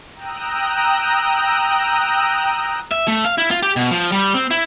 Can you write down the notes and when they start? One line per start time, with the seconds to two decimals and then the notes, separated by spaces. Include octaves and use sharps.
0.14 G5 A#5 D#6 E6 F#6
2.91 E5
3.08 A3
3.25 F5
3.38 E4
3.51 F4
3.63 G4
3.76 B2
3.91 F3
4.12 G3
4.34 C4
4.51 E4